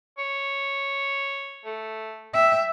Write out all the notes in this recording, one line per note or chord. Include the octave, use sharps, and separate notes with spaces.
C#5
A3
E5 G5